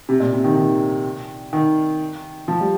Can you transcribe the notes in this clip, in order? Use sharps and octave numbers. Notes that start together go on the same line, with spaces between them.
C3
A#2
C3
D#3
D#3
D#3
F3
G3